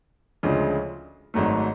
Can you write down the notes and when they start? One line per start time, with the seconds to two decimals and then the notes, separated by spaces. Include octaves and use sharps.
0.43 D2 C#3 F3 G#3 D4
1.34 G#1 G#2 F#3 A3